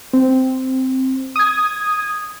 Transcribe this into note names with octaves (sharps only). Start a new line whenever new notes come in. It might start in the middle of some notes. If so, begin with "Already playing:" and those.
C4
D#6 G#6